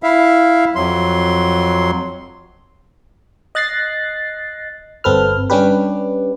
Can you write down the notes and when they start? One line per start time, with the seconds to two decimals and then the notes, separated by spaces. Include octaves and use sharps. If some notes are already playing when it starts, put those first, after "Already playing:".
0.03 E4 E5 F5
0.75 F2 F#3 C6
3.55 D#5 F#6 A6 A#6 C7
5.04 G1 C4 A4 B4 F6
5.50 G3 C#4 D4 G4 B4